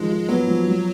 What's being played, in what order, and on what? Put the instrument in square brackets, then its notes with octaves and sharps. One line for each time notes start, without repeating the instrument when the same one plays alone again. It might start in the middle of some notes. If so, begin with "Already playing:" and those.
Already playing: [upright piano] D#3 F3 [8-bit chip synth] G#3
[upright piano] F4
[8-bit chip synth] F#3 [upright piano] B3
[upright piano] F3
F3